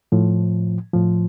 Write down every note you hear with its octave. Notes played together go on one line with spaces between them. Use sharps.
A2 F3
A2 F3